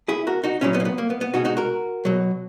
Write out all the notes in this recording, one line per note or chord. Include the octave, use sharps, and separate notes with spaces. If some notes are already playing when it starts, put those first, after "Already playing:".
E4 G#4
F#4 A#4
D#4 F#4
A#2 F#3 C#4 E4
B3 D#4
A#3
B3
A#3
B3
B3
B2 G#3 D#4 F#4
D#4 F#4
F#4 A#4
B2 F#3